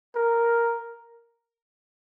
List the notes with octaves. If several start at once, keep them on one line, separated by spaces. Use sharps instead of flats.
A#4